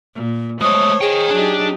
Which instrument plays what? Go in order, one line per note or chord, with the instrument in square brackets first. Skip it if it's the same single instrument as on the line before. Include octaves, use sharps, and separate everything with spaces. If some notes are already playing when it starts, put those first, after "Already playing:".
[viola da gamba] A#2
[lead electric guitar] G#3 A3 [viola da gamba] C5 C#5 [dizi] D#6
[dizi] G#4 [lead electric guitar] D#5 G5
[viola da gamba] F#3 D#4 G4 [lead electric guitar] D4